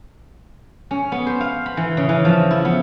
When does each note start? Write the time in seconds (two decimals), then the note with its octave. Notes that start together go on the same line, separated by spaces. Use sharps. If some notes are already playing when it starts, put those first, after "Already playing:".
0.91 C#4
1.12 B3
1.27 C5
1.41 F5
1.66 B5
1.77 E3
1.97 C#3
2.09 E3
2.25 F3
2.51 E4
2.65 B3